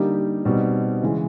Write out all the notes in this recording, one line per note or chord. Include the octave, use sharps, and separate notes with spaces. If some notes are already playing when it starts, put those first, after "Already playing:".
Already playing: D3 G3 A#3 D#4 G4
B2 G3 C4 D#4
C#3 E3 G#3